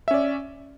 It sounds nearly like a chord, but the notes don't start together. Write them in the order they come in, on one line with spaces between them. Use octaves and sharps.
E5 C#4 D5